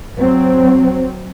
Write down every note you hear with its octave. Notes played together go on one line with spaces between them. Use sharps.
F#3 C4